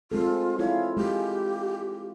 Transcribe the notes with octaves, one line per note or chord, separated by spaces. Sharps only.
G#3 C4 F4 A4
E4 F4 G#4 C#5
G#3 G4